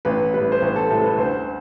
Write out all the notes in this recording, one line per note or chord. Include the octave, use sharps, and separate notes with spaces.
A1 B4
A2 G3 B4
C5
A1 B4
A4
A2 G3 A4
B4
D2 C5